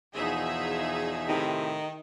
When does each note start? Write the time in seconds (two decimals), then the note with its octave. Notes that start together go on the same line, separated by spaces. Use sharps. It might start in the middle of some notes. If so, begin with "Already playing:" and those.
0.15 E2 B2 F3 D#4 G#4 E5
1.28 A2 C3 D#3